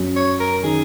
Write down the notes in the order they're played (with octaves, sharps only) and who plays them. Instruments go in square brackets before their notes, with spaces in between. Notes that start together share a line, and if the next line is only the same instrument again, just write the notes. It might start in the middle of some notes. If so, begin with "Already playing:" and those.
Already playing: [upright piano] F#2 F#3
[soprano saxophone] C#5
A#4
[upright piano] D#3 [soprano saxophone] G#4